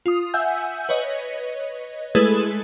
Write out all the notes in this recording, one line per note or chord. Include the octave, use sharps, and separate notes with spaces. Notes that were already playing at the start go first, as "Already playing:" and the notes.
F4 D#6
E5 F#5 G#5 E6 G6
B4 C#5 D#5
G#3 A3 E4 G#4 A4 B4